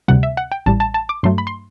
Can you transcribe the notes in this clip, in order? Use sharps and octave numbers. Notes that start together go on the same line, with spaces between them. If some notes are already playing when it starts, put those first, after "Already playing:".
D2 C3 G3 F#5
E5
F#5
G5
A1 A2 G3 A5
A5
A5
D6
G2 F#3 A3 C6
B5
C6